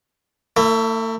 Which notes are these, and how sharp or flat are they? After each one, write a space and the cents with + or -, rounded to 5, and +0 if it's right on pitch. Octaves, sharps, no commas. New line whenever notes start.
A3 +40 E4 +0